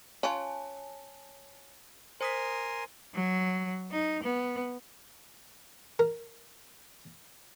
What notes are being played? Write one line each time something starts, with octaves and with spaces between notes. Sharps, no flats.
C#4 F4 C#5 G#5 A5
A#4 C5 G#5 C6 D#6 B6
F#3
D#4
B3
A#4